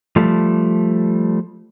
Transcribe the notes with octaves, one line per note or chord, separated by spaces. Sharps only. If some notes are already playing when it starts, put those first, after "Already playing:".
F3 G3 A3